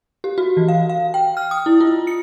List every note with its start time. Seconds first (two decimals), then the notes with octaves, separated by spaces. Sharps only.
0.24 G4
0.38 F#4
0.57 E3
0.68 F5
0.89 F5
1.14 G5
1.37 F6
1.51 D#6
1.66 E4
1.81 F4
2.07 C#7